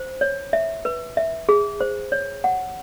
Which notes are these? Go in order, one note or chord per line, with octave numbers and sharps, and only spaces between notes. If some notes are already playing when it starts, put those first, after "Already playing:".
Already playing: C5
C#5
E5
B4
E5
G#4
C5
C#5
F#5